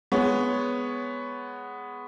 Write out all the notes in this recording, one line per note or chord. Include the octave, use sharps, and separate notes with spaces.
G#3 B3 C#5